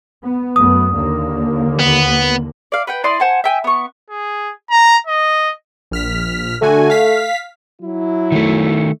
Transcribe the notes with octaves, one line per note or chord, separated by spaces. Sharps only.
B3
F#2 A3 B3 D#6
D#2 D3 A#3
B3
D5 F5
B4 F#5 G5
E4 D5 D#5 C6
C5 F#5 G#5 A5
E5 G5 G#5
B3 C#6
G#4
A#5
D#5
A#1 F6 B6
D3 A3 F#4 G#5
F5 B6
F#3 E4
D#3 A3